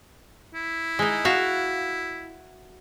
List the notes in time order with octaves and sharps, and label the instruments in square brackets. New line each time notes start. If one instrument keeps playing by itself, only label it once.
[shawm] E4
[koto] G#3 D#4
F#4 E5 F5